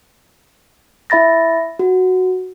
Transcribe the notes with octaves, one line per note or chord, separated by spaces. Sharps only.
E4 E5 B5 A6 A#6
F#4